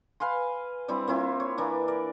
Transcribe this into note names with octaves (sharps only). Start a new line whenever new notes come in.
B4 F5 G#5 C6
G3 C4 D4 E4
A#3 C4 E4 F4
C#5
E3 A#3 D4
A#4 D5